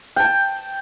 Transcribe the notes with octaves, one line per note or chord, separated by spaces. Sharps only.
G5 A5